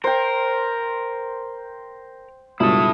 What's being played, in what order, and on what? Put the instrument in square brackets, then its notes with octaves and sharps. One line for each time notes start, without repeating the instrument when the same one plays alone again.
[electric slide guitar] A#4 [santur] C5 G5
[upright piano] C#2 G2 B2 [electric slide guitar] E4 A4 [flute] D#6